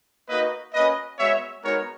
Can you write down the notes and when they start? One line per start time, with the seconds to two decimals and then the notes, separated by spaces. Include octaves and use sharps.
0.29 A#3 D#4 F#4 B4 D#5
0.73 A#3 C#4 F#4 B4 D#5
1.18 G#3 B3 F#4 C#5 E5
1.62 G#3 B3 D#4 F#4 A#4 C#5